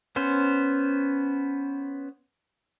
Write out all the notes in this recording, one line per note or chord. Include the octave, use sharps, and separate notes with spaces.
B3 C#4 C5